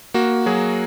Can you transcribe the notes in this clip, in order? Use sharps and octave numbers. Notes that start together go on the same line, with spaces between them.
A#3 F#4
F#3 G#4